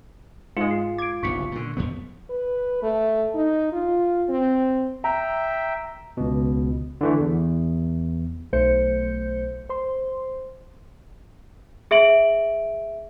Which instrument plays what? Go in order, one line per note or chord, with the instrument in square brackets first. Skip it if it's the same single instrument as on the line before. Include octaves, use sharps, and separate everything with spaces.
[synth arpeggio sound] G#2 G#3 [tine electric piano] F4 [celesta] C#7
[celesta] C7
[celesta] D6 D7 [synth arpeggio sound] G#6
[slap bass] F#1 B1 G2 [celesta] C#6 B6 C#7
[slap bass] A#2 D3
F2 F3 B3
[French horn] B4
A3
D#4
F4
C4
[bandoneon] E5 G5 [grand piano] A#5
[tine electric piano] C#2 B2
D3 E3 A3
E2
[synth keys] B1 A3 C5 G6 C#7
C5 C6
[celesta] G#4 E5 D7 F#7